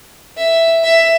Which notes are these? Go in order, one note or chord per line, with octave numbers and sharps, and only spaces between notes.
E5
E5